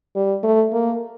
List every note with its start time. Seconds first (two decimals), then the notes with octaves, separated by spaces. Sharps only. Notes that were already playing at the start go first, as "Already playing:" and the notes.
0.16 G3
0.43 A3
0.72 A#3